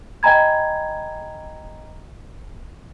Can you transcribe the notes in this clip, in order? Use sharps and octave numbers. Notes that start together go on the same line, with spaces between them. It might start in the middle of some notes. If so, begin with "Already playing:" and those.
D#5 G5 G#5 A#5 B5 G#6